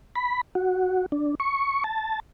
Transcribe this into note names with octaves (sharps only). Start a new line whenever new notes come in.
B5
F#4
D4
C#6
A5